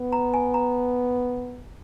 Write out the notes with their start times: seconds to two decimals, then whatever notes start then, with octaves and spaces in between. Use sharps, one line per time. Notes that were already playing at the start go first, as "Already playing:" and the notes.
Already playing: B3
0.12 A#5
0.34 G#5
0.54 A#5